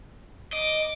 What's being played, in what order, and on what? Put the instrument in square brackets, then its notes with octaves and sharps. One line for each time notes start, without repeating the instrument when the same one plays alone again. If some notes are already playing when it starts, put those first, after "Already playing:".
[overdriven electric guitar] D#5 [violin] D6